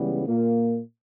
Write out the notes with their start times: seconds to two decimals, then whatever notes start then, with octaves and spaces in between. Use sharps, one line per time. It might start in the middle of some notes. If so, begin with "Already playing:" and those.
Already playing: C#2 C#3 E3 G3 B3
0.26 A#2 A#3